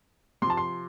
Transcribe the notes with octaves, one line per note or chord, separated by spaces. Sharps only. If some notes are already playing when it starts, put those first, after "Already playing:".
C3 F3 A5 C6
C6